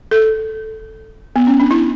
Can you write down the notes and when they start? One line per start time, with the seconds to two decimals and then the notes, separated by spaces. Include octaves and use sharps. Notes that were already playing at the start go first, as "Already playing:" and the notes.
0.11 A4
1.36 B3
1.47 C#4
1.60 D4
1.71 E4